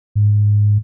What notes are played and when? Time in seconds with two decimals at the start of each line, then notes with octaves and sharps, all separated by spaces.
0.15 G#2